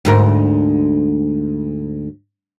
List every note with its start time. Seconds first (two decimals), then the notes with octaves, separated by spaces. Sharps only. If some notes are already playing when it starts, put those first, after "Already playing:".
0.05 D2 G#2 A#4